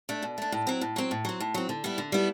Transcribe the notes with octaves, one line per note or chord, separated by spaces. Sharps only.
A3 D4
B2
A3 D4
A2
F#3 C4
A2
F#3 C4
A2
F#3 C4
A2
F#3 C4
D3
G3 B3 E4
D3
G3 B3 E4